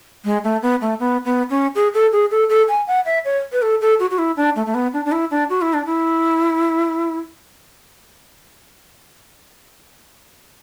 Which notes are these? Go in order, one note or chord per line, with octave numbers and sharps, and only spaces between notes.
G#3
A3
B3
A3
B3
B3
C#4
G#4
A4
G#4
A4
A4
G#5
F#5
E5
C#5
B4
A4
A4
F#4
F#4
E4
D4
A3
A3
B3
D4
D4
E4
D4
F#4
E4
D4
E4